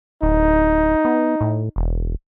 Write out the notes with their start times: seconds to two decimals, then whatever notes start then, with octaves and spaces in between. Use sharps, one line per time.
0.22 D1 D#4
1.05 B3
1.41 A2
1.76 E1